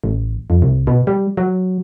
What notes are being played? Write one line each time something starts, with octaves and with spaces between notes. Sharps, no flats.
A1
F2
C2
B2
G3
F#3